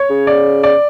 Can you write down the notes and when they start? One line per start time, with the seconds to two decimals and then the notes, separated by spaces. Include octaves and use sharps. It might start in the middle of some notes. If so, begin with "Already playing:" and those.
Already playing: C#5
0.10 C#3
0.27 D5
0.63 D5